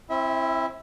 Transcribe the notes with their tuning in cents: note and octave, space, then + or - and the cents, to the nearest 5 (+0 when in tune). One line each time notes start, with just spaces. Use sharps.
C4 +25 E4 +10 E5 -30